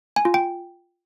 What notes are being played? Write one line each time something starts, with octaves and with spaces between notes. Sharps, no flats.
G#5
F4
G5